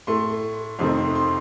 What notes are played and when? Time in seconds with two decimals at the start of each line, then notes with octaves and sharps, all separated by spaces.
0.07 A2 A3 C6
0.79 F2 C3 D#3 A3 C6
0.97 C6
1.15 C6